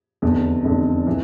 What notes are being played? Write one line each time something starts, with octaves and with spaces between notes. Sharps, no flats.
F1 E2 D3
F1 E2 D3
E3